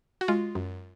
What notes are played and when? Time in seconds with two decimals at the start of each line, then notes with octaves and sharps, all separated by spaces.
0.21 F#4
0.28 G#3 F4
0.55 F#2